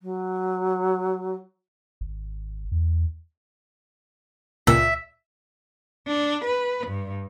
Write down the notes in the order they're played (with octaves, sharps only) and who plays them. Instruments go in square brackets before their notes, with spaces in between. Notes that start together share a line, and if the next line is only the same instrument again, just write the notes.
[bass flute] F#3
[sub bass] G#1
E2
[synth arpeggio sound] C#2 A#2 [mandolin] E5
[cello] D4
B4
G2